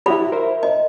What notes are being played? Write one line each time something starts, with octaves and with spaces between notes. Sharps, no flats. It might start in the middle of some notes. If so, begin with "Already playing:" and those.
E4 F#4 G4 A4 D5 B5
A#4 C5 E5
D#5